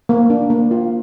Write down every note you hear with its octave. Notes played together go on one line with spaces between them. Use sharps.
A#3
D4
A#3
F4